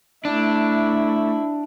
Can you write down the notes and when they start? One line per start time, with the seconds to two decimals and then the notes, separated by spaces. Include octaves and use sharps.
0.25 A3 D4 E4